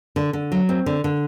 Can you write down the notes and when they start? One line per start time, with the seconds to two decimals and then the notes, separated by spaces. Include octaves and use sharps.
0.16 D3
0.33 D3
0.52 F#3
0.69 C4
0.86 D3
1.04 D3